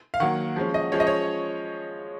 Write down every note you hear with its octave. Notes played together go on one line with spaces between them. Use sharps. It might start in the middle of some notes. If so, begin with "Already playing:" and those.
F5
D#3 F#3 A#3 F#5
F3 G#3 C#4
D#5
F3 G#3 C#4 C#5
D#5
C#5